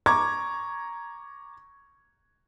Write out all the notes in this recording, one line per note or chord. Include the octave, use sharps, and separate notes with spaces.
A#5 C#6 D6 G#6